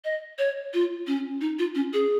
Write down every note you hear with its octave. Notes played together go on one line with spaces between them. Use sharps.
D#5
C#5
F4
C#4
D#4
F4
C#4
G#4